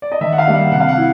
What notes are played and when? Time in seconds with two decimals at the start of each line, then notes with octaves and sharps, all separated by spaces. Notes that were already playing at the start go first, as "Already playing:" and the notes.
0.02 D5
0.12 D#5
0.21 D#3 E5
0.32 F#5
0.38 F5
0.46 G3 A#3 D4
0.55 F#5
0.72 C3 F#5
0.80 F5
0.89 F#5
0.98 E4